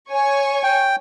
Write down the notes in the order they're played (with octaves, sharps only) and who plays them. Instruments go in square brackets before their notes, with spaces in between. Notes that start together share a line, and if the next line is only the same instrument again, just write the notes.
[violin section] C#5 G#5 C#6
[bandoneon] G5